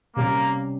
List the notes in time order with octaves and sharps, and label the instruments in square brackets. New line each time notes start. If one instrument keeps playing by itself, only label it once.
[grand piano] C3 G3 C#4 [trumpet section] A#3